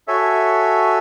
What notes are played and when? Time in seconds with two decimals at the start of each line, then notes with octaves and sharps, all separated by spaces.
0.08 F#4 A4 C#5 E5 G#5